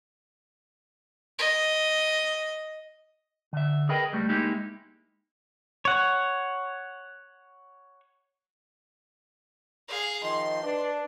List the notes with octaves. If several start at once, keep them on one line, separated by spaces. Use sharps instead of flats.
D#5
D3 E5
G#4 A#4 B4 D#5 G5
C#2 G3 A3
G#3 A#3 D#4 E4 G4
C#5 F#5
G#4 F5
D#3 F3 D#5 C6
D4 B4